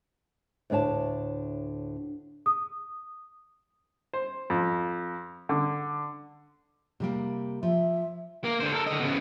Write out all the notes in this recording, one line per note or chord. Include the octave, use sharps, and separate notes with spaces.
D2 A2 D4 C#5 A5
D#6
C5
F2
D3
C3 G3 A#3
F3 E5
A#3 A#4
D3 C5
A4 A#4
D3 D#5
C#3 B3